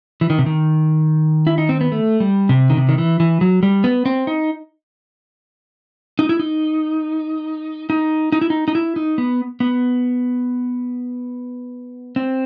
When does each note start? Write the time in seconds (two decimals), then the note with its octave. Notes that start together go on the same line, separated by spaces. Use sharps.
0.21 E3
0.30 D#3
0.38 C3
0.46 D#3
1.47 E4
1.58 D#4
1.69 C4
1.81 B3
1.92 A3
2.20 G3
2.49 C3
2.70 D#3
2.77 C3
2.89 D#3
2.98 E3
3.20 E3
3.41 F#3
3.63 G3
3.84 B3
4.06 C4
4.27 D#4
6.19 D#4
6.29 E4
6.39 D#4
7.90 D#4
8.32 D#4
8.41 E4
8.50 D#4
8.68 D#4
8.75 E4
8.96 D#4
9.18 B3
9.60 B3
12.16 C4